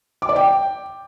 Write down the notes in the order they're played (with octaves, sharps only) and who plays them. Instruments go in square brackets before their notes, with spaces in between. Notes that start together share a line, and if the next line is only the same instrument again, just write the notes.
[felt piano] D6
D5
G5